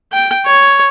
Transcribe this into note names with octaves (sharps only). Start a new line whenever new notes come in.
G5
C#5